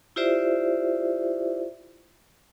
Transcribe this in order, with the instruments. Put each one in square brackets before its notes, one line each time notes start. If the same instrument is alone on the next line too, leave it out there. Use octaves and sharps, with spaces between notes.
[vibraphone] E4 F4 G4 C5 D5 E5